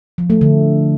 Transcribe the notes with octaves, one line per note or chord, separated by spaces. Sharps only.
F3
A3
D3